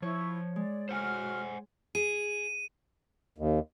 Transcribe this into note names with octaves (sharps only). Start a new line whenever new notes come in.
F3 E4 C#5 C#6
G#3 D5
F#4 C5 F#5 G#5 F6
G#4 D#7
D#2